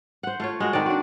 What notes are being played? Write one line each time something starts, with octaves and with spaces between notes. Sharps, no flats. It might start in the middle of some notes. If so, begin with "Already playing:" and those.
C5 F#5
A3 F4 C#5
G#3 F#4 A#4
D#3 C4 A4 D5
D4 F#4